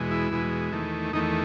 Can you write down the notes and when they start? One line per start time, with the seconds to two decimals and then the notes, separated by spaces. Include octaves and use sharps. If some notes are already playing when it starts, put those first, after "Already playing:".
Already playing: E2 B2 G#3
0.11 E4
0.31 E2 B2 G#3
0.72 E2 D#3 A3
1.13 E2 D#3 A3 D#4